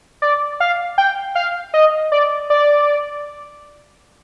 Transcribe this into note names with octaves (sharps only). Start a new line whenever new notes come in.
D5
F5
G5
F5
D#5
D5
D5